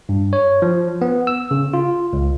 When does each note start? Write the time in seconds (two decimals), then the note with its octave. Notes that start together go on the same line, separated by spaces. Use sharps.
0.09 G2
0.33 C#5
0.62 F3
1.01 B3
1.27 E6
1.51 C#3
1.74 F4
2.13 C#2